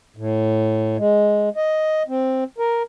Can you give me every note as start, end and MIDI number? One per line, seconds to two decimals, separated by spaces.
0.17 0.97 45
0.97 1.49 56
1.56 2.03 75
2.08 2.44 60
2.58 2.83 70